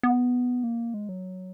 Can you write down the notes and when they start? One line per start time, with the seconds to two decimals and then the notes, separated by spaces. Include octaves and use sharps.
0.03 B3
0.64 A#3
0.94 G#3
1.09 F#3